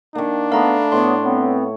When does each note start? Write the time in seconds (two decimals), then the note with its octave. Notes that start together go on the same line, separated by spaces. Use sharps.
0.15 D#3 A#3 D4
0.52 A3 B3 F5 A#5 B5
0.92 A2 B3 C#5 C6
1.24 B3 C4